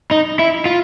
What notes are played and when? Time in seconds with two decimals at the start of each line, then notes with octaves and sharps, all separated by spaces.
0.11 D#4
0.39 E4
0.66 F4